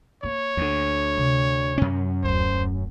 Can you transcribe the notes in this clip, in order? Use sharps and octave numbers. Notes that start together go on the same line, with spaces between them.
A#3 C#5
D2 D3
C3
F#2 C#4
D#1 D2 C5